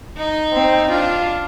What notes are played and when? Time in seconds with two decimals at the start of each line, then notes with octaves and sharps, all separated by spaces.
0.17 D#4
0.53 C4
0.91 D4 F4